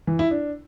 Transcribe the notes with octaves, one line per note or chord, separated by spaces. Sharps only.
E3
E4
D4